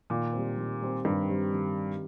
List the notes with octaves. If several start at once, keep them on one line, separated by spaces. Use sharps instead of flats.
A#2 D#3
G3 C4
D#3
G3 C4
G2 D#3
G3 C4
D#3